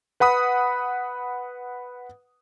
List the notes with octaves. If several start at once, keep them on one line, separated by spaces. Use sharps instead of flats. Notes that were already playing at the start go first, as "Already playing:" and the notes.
B4 F#5 B5 D#6